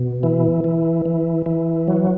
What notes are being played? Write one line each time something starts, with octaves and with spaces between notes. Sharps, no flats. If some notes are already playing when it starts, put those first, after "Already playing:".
Already playing: B2
E3
E3
E3
E3
F#3